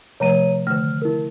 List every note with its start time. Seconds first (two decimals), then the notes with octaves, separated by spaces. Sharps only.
0.20 C3 F3 A3 C#5 A#5 D#7
0.67 D3 D#3 A3 F6
1.02 E4 A#4